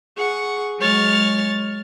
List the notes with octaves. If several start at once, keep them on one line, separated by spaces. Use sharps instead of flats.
G#4 F#5 C#6
F#3 G#3 C#5 F6 A6